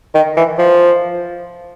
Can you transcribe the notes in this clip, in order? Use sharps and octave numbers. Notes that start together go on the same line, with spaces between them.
D#3
E3
F3